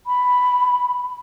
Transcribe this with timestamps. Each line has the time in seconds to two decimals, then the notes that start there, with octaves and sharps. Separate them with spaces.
0.07 B5